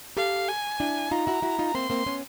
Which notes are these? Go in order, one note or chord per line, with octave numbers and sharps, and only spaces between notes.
G4 A4 F5
G#5
D4 E4
D#4 F4 A#5
E4 F#4
E4 F#4
D#4 F4
A#3 C4 C6
A#3 C4
B3 C#4